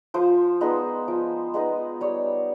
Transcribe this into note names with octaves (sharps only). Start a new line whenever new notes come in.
F3 C5
G#3 B3 D#4
F3
G#3 B3 D#4
G3 C#5